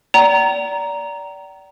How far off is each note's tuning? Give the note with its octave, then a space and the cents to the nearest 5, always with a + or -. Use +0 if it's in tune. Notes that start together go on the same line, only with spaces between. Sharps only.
D5 -20 G5 -40 A#5 +0